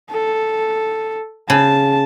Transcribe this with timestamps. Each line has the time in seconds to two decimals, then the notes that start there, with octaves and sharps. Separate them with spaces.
0.11 A4
1.50 C#3 A5